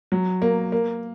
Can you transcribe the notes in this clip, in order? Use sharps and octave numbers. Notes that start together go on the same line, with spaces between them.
F#3
A#3
A#3